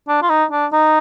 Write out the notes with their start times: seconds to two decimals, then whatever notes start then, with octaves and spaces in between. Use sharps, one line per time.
0.08 D4
0.22 F4
0.30 D#4
0.51 D4
0.73 D#4